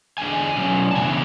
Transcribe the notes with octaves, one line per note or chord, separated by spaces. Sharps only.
E2 D3 G#3 D4 G#5
B2 F#3 C#4
A5
C#3 E3 B3 D4 G#5